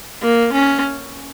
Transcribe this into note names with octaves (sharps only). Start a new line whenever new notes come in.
A#3
C#4